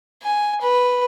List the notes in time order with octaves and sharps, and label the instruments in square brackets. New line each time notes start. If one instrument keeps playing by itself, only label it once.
[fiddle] G#5
B4